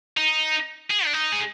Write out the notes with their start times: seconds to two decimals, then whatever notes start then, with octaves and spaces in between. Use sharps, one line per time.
0.17 D#4
0.90 G#4
1.05 D4
1.13 D#4
1.32 G#4